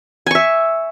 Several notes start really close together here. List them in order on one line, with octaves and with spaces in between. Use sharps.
G#5 C#6 E5